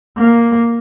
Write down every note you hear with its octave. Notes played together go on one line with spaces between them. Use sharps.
A#3